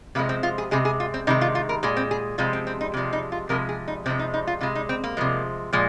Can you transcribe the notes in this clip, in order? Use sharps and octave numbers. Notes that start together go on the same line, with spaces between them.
C3 F3 G#3 A#3
C4
F4
G#4
C3 G#3 G#4
G#4
F4
C4
C3 D#3 G#3 D#4
F4
F4
A#4
A#2 G#3 G#4
C4
G#4
C3 F3 G#3 F4
C4
C4
D#4
C3 F3 G#3
D#4
F4
C3 F3 G#3 A#4
G#4
D#4
C3 F3 G#3 C4
D#4
D#4
F4
C3 G#3 F4
D#4
C4
A#3
C3 F3 G#3
A#2 F3 G#3